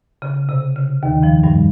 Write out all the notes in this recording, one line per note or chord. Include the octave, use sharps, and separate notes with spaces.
C#3
C3
C#3
D#2 D#3
F2 F3
G2 G3